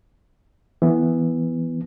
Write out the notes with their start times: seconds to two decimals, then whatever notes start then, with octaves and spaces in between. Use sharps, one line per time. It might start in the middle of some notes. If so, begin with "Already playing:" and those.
0.82 E3 B3